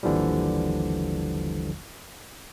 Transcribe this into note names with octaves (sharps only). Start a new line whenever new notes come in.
G#1 D#2 D3 E3 F3 G3